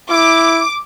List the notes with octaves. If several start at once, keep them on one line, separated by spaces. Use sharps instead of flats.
E4 D6